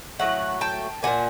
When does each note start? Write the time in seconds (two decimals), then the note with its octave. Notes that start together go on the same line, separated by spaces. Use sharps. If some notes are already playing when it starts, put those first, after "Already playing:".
0.19 A2 F#3 A3 F#5
0.61 G5 A5
1.03 A#2 F3 A#3 F#5 G#5